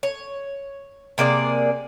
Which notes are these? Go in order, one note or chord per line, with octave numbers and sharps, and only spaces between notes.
C#5
C3 A#3 G#4 D5